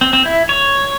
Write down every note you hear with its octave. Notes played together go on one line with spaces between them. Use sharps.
C4
C4
E4
C#5